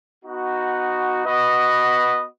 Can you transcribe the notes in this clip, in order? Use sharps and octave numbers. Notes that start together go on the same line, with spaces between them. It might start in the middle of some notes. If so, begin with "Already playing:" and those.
B3 D#4 F#4
B3 F#4 B4 D#5